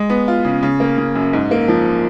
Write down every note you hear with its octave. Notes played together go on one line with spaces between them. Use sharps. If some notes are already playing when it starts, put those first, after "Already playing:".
Already playing: G#3
B3
F4
C#3
C#3
A#3
C#3
F#2
G#2
A#3
F3